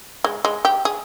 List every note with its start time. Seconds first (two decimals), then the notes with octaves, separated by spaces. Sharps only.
0.24 G#3
0.45 G#3
0.65 G4
0.85 G#4